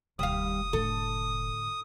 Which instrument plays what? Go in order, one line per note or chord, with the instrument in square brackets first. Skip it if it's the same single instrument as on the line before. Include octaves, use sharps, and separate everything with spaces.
[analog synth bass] F1 [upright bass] D#2 [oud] G3 F5 [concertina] D#6
[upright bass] A2 D3 [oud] A4